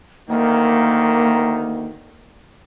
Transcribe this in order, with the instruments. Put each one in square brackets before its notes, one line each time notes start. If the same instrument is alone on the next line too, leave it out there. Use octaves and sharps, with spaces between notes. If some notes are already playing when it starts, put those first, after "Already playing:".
[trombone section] D2 D#3 [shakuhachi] A#3